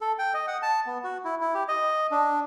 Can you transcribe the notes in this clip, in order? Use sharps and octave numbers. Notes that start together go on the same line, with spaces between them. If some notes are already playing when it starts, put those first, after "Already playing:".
A4
G5
D#5
F#5
A5
B3
F#4
E4
E4
G4
D#5
D4